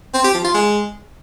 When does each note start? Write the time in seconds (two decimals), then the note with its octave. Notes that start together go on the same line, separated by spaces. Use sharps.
0.14 C4
0.24 G4
0.34 F3
0.44 F4
0.54 G#3